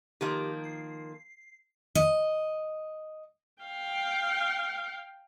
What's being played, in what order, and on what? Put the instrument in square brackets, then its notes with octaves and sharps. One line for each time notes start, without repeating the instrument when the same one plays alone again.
[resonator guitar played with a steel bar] D#3 F3 A#3 [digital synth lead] G4
[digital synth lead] C7
[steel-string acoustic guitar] D#5
[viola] F5 G5